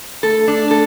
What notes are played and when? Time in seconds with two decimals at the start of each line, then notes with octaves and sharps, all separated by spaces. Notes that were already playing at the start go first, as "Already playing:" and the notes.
0.23 A3 A4
0.48 D4
0.71 A4